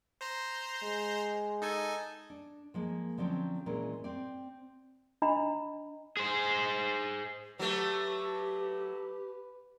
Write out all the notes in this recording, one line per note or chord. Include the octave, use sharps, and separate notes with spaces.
C5 A#5 C6
G#3
D#4 A4 G#5
D4
F3 G#3 A#3
D3 F3 F#3 C4 C#4
A#2 E3 G#3 C#4 A#4
C4 D5
D4 D#5 A#5 B5
G#4 C5
F#3 A3 G4 B4